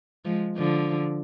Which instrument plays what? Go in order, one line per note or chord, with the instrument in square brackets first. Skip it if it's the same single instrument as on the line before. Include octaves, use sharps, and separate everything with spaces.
[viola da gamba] F3 G#3
D3 F3